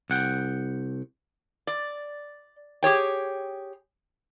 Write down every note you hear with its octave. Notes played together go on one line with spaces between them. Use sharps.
C2 F#5 G5
D5
G4 G#4 C#5 G5